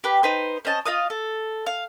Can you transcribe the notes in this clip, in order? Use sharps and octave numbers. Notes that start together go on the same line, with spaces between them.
G4 B4
D#4 B4 C5
C4 C#4 D#5 A5
F4 D#5 F5 D#6
A4
F5